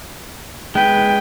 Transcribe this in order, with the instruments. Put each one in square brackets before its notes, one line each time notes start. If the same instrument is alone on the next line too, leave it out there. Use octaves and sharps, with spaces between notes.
[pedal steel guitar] G#3 B4 [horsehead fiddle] G5